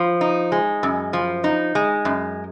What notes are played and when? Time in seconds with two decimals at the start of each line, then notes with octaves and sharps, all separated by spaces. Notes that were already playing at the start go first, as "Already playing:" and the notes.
Already playing: F3
0.21 D#4
0.52 G#3
0.83 F#2
1.13 F3
1.44 D#4
1.75 G#3
2.05 F#2